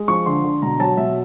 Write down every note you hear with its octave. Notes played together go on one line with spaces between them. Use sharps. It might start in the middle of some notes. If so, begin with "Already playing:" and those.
Already playing: G#3
F3 C#6
D3 C6
D3
B2 A#5
F#3 A5
B2 E5